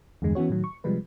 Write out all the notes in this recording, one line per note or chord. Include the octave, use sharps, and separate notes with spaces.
E2 G2 D3 G#3
E3 B3 C#4 F#4 C#5
A2 D#3 F#3
C#6
C3 F3 G3 G#3 B4